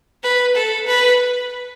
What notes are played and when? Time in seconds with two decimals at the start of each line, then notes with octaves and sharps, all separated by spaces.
0.23 B4
0.55 A4
0.87 B4